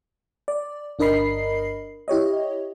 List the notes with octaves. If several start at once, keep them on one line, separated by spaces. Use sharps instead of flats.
D5
G1 D4 A#4 D#5 B5 C7
E4 G4 C#5 D#5